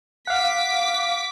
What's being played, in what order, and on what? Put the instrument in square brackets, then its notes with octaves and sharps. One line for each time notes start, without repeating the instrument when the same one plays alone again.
[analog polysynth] F5 F#5 [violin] D6 B6